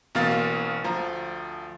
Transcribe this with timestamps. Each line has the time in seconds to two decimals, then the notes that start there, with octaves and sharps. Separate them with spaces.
0.15 A1 B2 A#3 F5 A6
0.84 D2 F3 A#5